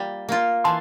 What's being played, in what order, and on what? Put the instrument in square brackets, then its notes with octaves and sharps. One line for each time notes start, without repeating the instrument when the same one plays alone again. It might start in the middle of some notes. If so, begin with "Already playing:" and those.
Already playing: [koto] G3 A#3 F4
A#3 F4
[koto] E3 [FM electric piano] A5 C6